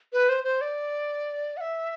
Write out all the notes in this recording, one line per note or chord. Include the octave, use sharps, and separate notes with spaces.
B4
C5
C5
D5
F#5
E5